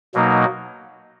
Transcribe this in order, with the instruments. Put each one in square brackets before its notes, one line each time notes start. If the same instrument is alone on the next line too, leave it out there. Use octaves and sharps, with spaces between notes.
[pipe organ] B2 F#3 A#3 D#4